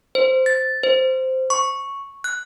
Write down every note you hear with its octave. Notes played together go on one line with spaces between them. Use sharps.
C5
A6
C5
C#6
F#6